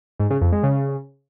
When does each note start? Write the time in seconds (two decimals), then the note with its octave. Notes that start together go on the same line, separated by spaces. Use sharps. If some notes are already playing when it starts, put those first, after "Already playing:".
0.19 G#2
0.30 C#3
0.41 F2
0.52 G#3
0.63 C#3